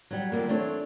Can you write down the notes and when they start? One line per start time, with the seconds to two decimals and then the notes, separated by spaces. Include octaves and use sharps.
0.11 F#3 G3
0.32 D3 F3 G3 G#3 A#3
0.49 E3 A3 C4 D4 C#5